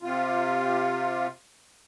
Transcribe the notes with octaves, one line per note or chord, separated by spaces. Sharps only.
C3 F4